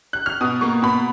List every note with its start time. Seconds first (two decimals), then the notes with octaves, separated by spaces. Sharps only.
0.13 F#6
0.26 F6
0.41 B2 D#6
0.61 A#3 C#6
0.82 B2 B5